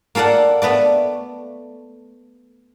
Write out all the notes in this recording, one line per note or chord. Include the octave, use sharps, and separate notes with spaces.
A#3 F4 A4 D5 F#5
A3 B3 B4 D5